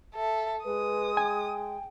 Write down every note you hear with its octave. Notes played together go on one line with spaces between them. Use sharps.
A4 E5
G#3 B4 D#6
G5 G#5